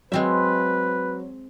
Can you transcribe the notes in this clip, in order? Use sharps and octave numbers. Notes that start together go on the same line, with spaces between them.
F#3 G#3 C4 B4 E5